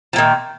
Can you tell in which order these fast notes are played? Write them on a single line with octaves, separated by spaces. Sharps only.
F3 A#2 D#3